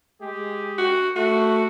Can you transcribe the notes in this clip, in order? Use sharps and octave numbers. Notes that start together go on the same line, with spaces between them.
G#3 G4 G#4
F#4
A3 F#4